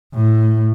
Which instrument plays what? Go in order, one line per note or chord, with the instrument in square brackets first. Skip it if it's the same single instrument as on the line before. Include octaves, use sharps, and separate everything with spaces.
[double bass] A2